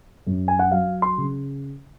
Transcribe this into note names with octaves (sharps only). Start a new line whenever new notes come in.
F#2
G#5
F#5
F#3 F5
C6
C#3